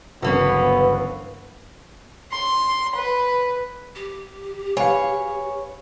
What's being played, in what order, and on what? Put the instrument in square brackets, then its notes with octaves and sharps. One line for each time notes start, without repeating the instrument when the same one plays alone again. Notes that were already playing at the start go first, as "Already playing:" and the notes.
[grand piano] G1 C#2 F#3 [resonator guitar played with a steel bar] E3 A#3 C#4 [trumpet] B3 [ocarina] B4
[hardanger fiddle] C6
B4
[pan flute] G4
[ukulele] B4 F5 [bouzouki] C#5 [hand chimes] G#5